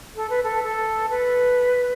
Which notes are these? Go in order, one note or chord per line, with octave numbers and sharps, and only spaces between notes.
A4
B4
A4
A4
B4